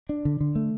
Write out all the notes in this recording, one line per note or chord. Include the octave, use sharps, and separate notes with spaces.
D4
D3
D3
A3